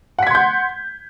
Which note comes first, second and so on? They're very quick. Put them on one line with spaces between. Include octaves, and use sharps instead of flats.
F#5 B6 G#6 C6 G6